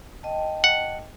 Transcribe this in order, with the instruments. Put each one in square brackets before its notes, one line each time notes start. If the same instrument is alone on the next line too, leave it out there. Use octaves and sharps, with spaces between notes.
[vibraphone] D#5 G5 A5
[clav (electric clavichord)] F#5